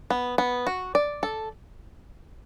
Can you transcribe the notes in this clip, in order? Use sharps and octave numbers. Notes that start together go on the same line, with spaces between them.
B3
B3
F#4
D5
A4